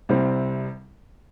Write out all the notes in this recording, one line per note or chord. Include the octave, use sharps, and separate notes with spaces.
C2 C3 G3 C4